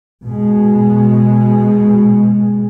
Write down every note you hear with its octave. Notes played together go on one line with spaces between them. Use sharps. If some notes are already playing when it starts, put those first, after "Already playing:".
B2 G#3